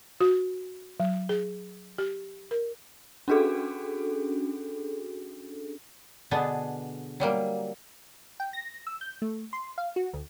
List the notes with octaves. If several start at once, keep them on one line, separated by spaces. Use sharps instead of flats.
F#4
F#3
G#4
G4
A#4
C#4 D4 F#4 G#4 A4
B2 D3 B3 D4 G#4
F#3 G3 A#3
G5
A#6
E6
G6
A3
C6
F5
F#4
D2